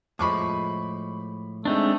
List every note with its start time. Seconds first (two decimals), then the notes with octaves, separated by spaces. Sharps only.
0.19 A2 F3 G#3 B5 C#6 D6
1.65 G#3 A3 C4 D4 D#4